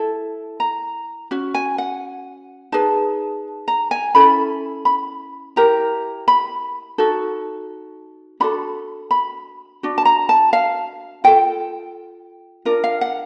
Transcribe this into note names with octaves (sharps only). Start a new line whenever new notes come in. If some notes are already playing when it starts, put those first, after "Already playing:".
Already playing: E4 A4
A#5
C#4 F#4
G#5
F#5
D#4 G#4 B4 A5
A#5
G#5
C#4 E4 A4 B5
B5
E4 G4 A#4 A#5
B5
D#4 F#4 A4
D4 F#4 A4 B5
B5
D4 F#4
A5
A#5
A5
F5
F4 A4 G5
D4 F4 A#4
F5
F#5